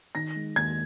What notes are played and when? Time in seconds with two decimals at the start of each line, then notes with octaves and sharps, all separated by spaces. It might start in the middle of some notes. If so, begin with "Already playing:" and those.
0.15 D#3 A#6
0.36 G#3
0.56 D#2 G#6